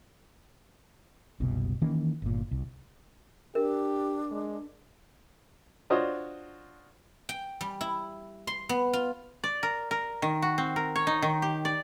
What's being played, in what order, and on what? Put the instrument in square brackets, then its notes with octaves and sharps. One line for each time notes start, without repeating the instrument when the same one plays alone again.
[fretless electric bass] F#1 C2 B2
D#3 E3 A#3 C#4
G1 A#2
C2
[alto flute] D4 [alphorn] G4 [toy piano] A#4
[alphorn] G#3
[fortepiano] D4 F4 F#4 C5 C#5 D#5
[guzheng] G5
G3
E4
C6
B3
F4
[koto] D5
A#4
A#4
D#3
F#4
C4
A#4
C#5
D#4
D#3
G4
D5